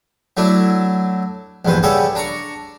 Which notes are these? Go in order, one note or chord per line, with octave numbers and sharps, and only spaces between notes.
F#3 A3 D4 E4
A#1 E2 G2 B4 C5
C#3 G3 G#4 A4 F#5 B5
D4 A#5 C#6